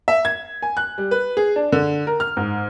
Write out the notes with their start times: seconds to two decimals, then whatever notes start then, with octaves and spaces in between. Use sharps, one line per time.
0.08 E5
0.25 G#6
0.62 G#5
0.77 F#6
0.98 G3
1.11 B4
1.37 G#4
1.56 D4
1.72 D3
2.07 A#4
2.20 F6
2.37 G#2